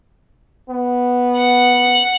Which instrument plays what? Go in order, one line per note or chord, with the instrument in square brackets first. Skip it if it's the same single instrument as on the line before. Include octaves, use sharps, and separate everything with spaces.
[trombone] B3
[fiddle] F#5